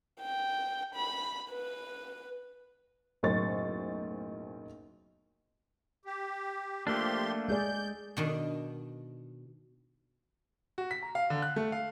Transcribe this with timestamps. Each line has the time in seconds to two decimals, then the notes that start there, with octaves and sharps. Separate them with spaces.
0.21 G5
0.95 B5
1.51 B4
3.23 F#1 B1 A2 C5 C#6 A6
6.05 G4
6.87 F3 A3 A#3 D4 G4 C6
7.48 G#3 G#4 D5 G6
8.17 B2 D#3 D4
10.78 F#4
10.91 B6
11.02 A#5
11.15 F5
11.30 D3
11.42 F#6
11.56 A3
11.72 F5